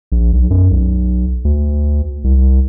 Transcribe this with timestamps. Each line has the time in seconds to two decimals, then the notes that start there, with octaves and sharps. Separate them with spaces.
0.12 A#1
0.33 B1
0.50 F#2
0.71 B1
1.45 D2
2.24 C2